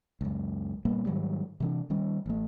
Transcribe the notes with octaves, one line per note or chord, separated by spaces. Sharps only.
C#2 F#2
A#2 G3 A#3 B3
G#2 D#3 F#3 G3
C3 E3 D4
D#3 G3 C#4
A1 A3